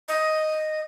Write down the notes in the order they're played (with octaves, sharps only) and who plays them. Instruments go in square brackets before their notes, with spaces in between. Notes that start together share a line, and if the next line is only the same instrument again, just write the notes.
[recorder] D#5